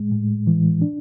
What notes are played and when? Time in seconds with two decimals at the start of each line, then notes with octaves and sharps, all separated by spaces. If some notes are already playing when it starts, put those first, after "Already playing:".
Already playing: A2 G#3
0.12 A2
0.47 E3
0.82 D4